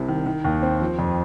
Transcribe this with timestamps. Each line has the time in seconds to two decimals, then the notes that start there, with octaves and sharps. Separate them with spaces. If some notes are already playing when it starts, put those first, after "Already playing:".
Already playing: C2 C3
0.08 D#3
0.26 D#3
0.44 D#2
0.63 C4
0.81 F3
0.99 F2